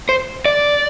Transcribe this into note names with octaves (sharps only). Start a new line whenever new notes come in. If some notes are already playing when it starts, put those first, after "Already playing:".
C5
D5